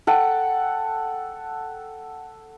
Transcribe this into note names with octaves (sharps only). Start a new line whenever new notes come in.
A4 F#5 G5